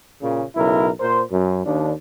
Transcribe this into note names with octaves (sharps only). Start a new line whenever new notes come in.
A#2 C#3
B1 C#3 E4 A#4
A#2 A#4 C5
F#2
D#2 D4